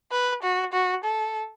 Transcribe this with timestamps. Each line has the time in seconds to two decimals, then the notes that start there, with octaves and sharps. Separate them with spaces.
0.11 B4
0.43 F#4
0.73 F#4
1.04 A4